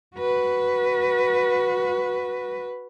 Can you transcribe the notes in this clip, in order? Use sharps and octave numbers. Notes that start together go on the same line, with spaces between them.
F#4 B4